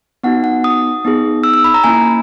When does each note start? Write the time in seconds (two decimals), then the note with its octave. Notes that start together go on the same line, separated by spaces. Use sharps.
0.23 B3 D#4 F#4 F#5
0.44 F#5
0.64 D#6
1.05 B3 D#4 G#4
1.43 E6
1.54 E6
1.64 B5
1.74 A#5
1.84 A#3 C#4 E4 G#5